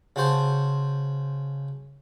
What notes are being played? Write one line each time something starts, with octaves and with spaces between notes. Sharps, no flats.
C#3 F#4 C5 A5